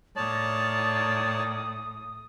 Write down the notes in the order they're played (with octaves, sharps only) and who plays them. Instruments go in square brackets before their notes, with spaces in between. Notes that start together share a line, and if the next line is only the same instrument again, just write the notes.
[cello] A2 [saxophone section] D#3 A#3 D5 [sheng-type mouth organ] C#5 A5 [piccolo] D#6